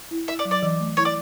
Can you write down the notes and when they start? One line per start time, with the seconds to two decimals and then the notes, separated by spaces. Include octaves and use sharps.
0.11 E4
0.28 E4 E5
0.39 D5
0.45 F#3
0.51 D5
0.62 E3
0.80 A3
0.97 E4 C#5
1.05 D5